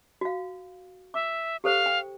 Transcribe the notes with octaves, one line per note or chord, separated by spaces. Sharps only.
F#4 F5
E5 D6
G4 A4 C5 F5
G5